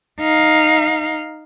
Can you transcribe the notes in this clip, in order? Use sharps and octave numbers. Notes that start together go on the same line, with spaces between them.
D#4 F5